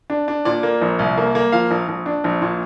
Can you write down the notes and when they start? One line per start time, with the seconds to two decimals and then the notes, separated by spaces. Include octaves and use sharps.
0.10 D4
0.28 D4
0.45 A#2 D5
0.63 A#3
0.81 A#1
0.99 C2
1.18 A#3
1.35 A#3
1.52 F3 F5
1.71 A#1
1.89 A#1
2.06 D4
2.24 A#1
2.42 A#2